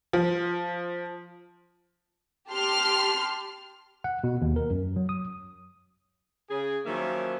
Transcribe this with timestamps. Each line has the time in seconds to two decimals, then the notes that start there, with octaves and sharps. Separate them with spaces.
0.13 F3
2.50 G4 A5 C6 F6
4.04 F#5
4.24 B2
4.42 D#2
4.56 A#4
4.70 F#2
4.96 F#3
5.09 D#6
6.50 C#3 G#4
6.86 D#3 F3 F#3 A#3 C#4 E5